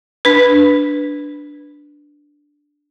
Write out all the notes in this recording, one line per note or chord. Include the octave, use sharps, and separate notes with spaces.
D4 B4